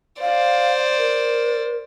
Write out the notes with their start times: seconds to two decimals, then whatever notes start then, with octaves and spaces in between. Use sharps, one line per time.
0.21 C5 D5 F5
0.98 A#4